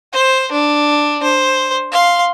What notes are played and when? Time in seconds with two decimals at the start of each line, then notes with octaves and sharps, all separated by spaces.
0.13 C5
0.52 D4
1.23 C5
1.92 F5 C6